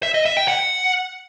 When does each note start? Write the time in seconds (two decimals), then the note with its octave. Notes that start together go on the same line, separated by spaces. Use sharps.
0.03 E5
0.14 D#5
0.25 E5
0.37 G5
0.48 F#5